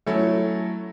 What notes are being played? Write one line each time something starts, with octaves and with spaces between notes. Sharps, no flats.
F#3 A3 C#4 E4 A4